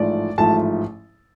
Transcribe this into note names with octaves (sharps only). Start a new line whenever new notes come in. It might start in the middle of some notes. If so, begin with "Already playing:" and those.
Already playing: A1 G#2 F3 A3 D5
A1 G#2 F3 A3 A5